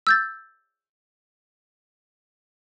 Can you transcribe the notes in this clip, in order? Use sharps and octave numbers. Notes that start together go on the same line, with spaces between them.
E6 G6 A6